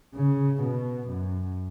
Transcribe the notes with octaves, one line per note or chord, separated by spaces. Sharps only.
C#3
B2
F#2